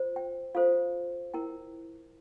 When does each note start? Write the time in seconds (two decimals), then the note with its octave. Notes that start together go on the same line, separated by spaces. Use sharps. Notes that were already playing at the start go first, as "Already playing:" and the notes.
Already playing: F4 C5
0.16 G5
0.55 F4 A4 C5 F5
1.34 E4 A#4 G5